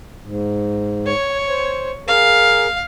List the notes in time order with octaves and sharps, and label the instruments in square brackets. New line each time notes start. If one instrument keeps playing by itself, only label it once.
[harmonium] G#2
[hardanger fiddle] C#5
[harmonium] C5
[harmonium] G#4 A#4 [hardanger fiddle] F5